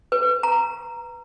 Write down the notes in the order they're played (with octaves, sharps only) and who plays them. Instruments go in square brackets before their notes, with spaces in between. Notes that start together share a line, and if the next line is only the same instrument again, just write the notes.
[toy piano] B4
A#5